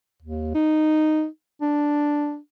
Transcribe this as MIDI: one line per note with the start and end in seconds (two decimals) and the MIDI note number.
0.22 0.53 39
0.55 1.27 63
1.61 2.38 62